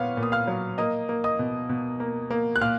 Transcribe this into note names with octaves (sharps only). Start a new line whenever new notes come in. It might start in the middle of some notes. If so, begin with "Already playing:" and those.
Already playing: A#2 B3 C#5 F5 F6
A#2
D#6
F5 F6
F#3
A#3 D#5 D#6
A#3
D#5 D#6
B2
B2
A#3
A#3
F#6
A#2 F5 F6